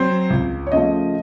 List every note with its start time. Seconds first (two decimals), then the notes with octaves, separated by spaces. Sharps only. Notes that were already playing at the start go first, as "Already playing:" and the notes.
Already playing: F#3 C4 C5
0.30 C#2
0.67 C#5
0.72 C#3 F3 A3 D#5